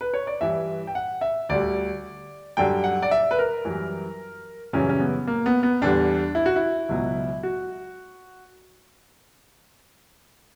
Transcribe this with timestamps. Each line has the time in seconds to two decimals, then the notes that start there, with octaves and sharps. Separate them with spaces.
0.01 B4
0.14 C#5
0.27 D5
0.41 G2 E3 G3 E5
0.87 G5
0.95 F#5
1.21 E5
1.49 D2 D3 G3 D5
2.57 F#2 D3 G3 G5
2.84 F#5
3.02 D5
3.11 E5
3.31 B4
3.39 A#4
3.65 F#2 E3 G3
4.73 F#2 C#3 E3 G3 C#4
4.89 C#4
5.00 B3
5.27 A#3
5.46 B3
5.63 B3
5.82 E2 D3 G3 D4
6.35 E4
6.46 F#4
6.56 E4
6.89 C#2 B2 F#3
7.43 F#4